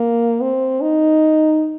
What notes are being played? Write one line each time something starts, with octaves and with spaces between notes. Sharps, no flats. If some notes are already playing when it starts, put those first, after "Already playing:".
Already playing: A#3
C4
D#4